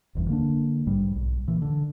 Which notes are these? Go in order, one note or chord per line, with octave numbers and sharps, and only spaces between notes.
F#1 E2 G2
D3 A#3 C#4 D4
A#1 G#2 G3
B1
A#2 E3
D3